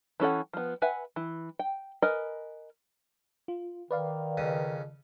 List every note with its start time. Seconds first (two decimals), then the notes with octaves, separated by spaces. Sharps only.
0.20 E3 C#4 A4 F#5
0.53 F3 B3
0.82 B4 E5 F#5 G#5
1.16 E3
1.59 G5
2.02 A#4 B4 D#5 G#5
3.48 F4
3.91 D#3 B4 D5 F5
4.37 F2 C#3 D#6